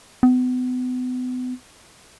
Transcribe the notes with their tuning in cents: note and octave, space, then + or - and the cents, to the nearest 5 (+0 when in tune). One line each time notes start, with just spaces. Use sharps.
B3 +35